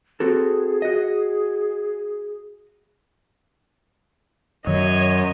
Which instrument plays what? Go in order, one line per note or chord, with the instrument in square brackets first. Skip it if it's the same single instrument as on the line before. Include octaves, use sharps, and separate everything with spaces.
[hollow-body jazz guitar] C4 F#4 A4 [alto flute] G#4
[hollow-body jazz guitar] F#4 D#5
[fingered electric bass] F#2 [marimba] D#3 [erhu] C#5 [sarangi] D#5